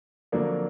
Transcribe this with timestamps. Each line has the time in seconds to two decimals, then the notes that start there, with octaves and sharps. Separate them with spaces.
0.32 F2 D3 F#3 A#3 D4